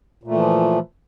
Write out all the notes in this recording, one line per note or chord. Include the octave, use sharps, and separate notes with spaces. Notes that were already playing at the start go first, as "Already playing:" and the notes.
A#2 E3 F3 A3